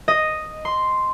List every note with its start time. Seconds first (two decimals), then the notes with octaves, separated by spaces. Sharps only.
0.08 D#5
0.65 C6